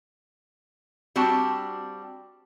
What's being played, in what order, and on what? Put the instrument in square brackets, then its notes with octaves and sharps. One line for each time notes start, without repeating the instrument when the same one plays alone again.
[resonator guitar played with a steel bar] G3 C4 D4 F#4 A5